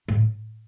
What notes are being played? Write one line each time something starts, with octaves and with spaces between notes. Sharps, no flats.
A2